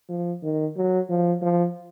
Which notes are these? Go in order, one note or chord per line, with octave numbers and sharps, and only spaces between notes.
F3
D#3
F#3
F3
F3